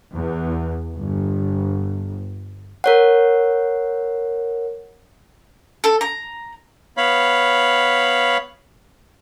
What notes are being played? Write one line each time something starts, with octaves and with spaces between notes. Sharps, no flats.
E2
G1
A#4 C#5 F#5
A4
A#5
B3 C#5 F5 B5